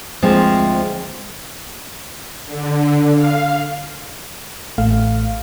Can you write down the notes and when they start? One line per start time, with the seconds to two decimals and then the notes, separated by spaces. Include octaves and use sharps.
0.22 D2 F3 G#3 C4
2.46 D3
3.14 F5
4.78 A1 A3 F5